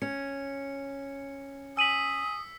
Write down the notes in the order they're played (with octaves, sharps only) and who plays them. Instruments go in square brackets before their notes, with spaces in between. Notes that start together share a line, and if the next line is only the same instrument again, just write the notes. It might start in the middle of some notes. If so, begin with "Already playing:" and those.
[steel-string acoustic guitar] C#4 [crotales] C#7
[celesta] G#5 D#7 F#7 [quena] D#6 [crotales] E6 B6